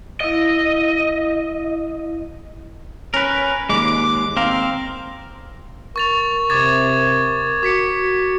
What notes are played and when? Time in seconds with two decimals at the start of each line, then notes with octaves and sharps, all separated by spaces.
0.20 E4 D#5 F5
3.14 C#4 A#4 B4
3.69 D#2 G#3 D6
4.37 C4 A#4 F5
5.96 A#4 C#6 A6 F7
6.50 C3 D6 G#6 A6
7.63 F#4 D6 B6 C#7